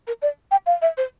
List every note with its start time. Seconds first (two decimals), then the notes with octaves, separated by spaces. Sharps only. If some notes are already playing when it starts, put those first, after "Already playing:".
0.07 A#4
0.22 D5
0.51 G5
0.66 F5
0.82 E5
0.97 C5